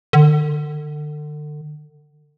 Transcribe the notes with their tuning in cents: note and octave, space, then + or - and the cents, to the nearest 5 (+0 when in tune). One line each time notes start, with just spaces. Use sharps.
D3 +35